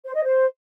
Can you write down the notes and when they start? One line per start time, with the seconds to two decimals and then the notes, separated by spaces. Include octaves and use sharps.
0.04 C5
0.14 D#5
0.24 C5